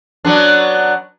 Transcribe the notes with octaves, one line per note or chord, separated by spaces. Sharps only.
F#3 B3 D4